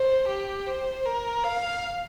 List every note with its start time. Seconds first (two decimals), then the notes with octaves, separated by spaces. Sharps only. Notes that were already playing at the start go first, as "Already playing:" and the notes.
Already playing: C5
0.28 G4
0.67 C5
1.05 A#4
1.44 F5